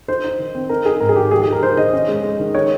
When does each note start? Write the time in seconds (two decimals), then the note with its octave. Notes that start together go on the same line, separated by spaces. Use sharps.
0.08 D#4 C5
0.24 D#4
0.39 D#3
0.54 C4
0.70 D#4 A#4
0.85 D#4 G#4
1.00 G#2 A#4
1.09 G#4
1.16 D#3 G4
1.31 G#3 G#4
1.42 G#4
1.47 D#4
1.52 A#4
1.62 D#3 C5
1.77 D#3 D#5
1.93 C#4
2.08 G#3
2.23 G#3
2.40 D#3
2.54 D#4 C#5